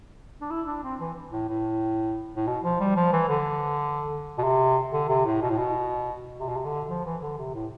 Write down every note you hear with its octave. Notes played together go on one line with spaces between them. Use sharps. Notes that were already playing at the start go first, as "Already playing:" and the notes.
D4
E4
D4
C4
E3
A2
A2
A2
B2
F3
G3
F3
E3
D3
B2
C3
D3
C3
A2
B2
A2
B2
C3
B2
C3
D3
F3
E3
D3
C3
A2